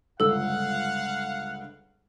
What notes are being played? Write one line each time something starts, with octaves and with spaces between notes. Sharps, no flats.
G1 C#2 D3 A4 F5 F#5 E6